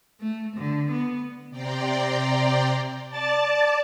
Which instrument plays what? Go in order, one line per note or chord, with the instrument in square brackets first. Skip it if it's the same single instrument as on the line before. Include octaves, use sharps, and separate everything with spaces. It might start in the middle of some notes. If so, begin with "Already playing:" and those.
[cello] A3
D3
B3
[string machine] C3 D5 G5 A#5 C6
D5 A5 A6